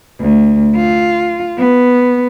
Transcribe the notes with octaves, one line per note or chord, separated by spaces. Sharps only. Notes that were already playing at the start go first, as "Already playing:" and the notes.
D2
F4
B3